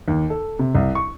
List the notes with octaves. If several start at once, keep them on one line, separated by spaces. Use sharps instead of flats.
D#2
A4
C3
C2
C#6